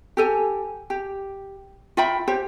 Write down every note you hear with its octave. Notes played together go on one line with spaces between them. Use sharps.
G4 A4 G#5
G4
F4 E5 G5 B5
G4 C5